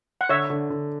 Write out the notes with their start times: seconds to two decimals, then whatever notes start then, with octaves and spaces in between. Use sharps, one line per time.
0.21 F#5
0.29 D3 C#5 E5
0.50 D3
0.70 D3